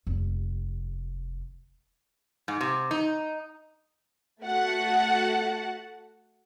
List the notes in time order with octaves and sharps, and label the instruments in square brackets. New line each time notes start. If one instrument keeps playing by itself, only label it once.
[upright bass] F1 D#2
[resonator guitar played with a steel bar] G#2
C3
D#4
[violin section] A3 F#4 F#5 A5